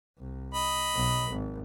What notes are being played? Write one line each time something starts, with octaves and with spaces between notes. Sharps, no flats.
C2
D#5 B5
B1 F#3
G#1